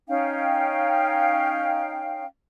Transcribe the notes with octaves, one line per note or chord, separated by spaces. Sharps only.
C#4 D#4 F5 G5